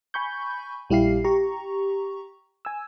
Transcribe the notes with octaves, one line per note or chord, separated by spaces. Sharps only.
G#5 B5 C#6 G6
A#1 G3 E4 G4 F5 C7
G4 A#5 C#6
G#5 E6